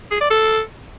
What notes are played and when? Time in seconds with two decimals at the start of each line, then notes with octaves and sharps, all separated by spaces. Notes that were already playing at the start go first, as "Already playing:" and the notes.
0.11 G#4
0.21 D5
0.30 A4